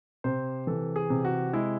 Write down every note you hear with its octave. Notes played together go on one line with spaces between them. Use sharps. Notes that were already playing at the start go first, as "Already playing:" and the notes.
C3 C5
E3 A4
G#4
C3
F#4
G#3 E4